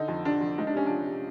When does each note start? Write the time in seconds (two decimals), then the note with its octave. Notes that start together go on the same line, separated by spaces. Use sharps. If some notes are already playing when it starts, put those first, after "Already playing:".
Already playing: D3 D#4
0.08 F2
0.25 F2 D4
0.41 F2
0.58 C#2 D#4
0.67 D4
0.74 C3 C#4
0.86 F3 D4
1.06 C3